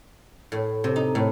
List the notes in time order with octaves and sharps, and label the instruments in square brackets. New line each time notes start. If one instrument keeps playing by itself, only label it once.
[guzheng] A2
C3
D#4
A2